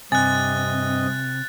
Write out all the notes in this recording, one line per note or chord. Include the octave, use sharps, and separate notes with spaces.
G2 C3 C4 D#5 G#5 F#6 A6